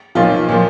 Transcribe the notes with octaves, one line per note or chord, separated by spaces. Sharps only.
B1 A#2 F3 F4
A#2 F3